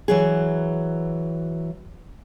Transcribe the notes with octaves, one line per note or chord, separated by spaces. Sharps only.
E3 F#3 G#4